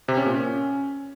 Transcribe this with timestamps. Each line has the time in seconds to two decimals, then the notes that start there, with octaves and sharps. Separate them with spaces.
0.08 C3
0.17 C#4
0.26 A#2
0.35 C#4